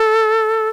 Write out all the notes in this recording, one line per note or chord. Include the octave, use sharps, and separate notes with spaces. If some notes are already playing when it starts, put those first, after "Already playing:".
Already playing: A4